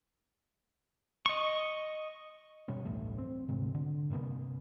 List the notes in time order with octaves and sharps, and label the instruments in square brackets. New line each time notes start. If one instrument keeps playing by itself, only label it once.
[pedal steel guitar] D#5 C#6
[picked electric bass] B2 G3 B3 C#4
D1 A1 G2 A3
C4
D2 G#2 C3
D3
G2 C3 A#3 B3